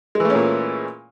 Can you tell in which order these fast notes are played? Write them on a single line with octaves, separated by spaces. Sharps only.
G#3 E3 A3 C#4 A#2